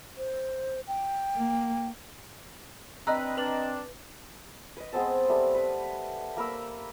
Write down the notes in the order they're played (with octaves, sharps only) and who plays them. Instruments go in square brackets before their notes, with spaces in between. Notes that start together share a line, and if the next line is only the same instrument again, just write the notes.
[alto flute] C5
G5
[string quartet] A#3
[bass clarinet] C4 [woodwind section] D4 B4 [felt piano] D#5 A#5 [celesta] E6 F#6
[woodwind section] D4 [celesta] B4 F#7
[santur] B4 D#5
G#3 B3 C4 A5
G3 A3
B4
A#3 A#4 B5 E6